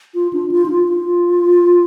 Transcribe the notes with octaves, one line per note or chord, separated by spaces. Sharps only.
F4
D4
F4
D#4
F4
F4